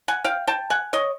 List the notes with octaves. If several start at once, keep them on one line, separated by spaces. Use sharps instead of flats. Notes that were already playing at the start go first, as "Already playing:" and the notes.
F#5 G#5
F5 G5
G5 A5
F#5 G#5
C#5 D#5